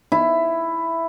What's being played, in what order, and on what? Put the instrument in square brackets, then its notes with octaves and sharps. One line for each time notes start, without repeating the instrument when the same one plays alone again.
[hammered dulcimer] E4